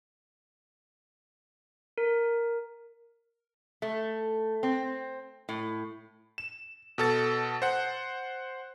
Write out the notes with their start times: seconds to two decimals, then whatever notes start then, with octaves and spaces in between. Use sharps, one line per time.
1.98 A#4
3.82 A3
4.63 C4
5.49 A2
6.38 E7
6.98 B2 A4 A6
7.62 C5 F#5